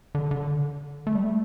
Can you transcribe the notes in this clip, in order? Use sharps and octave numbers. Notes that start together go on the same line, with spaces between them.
D3
D3
A3
G3
A3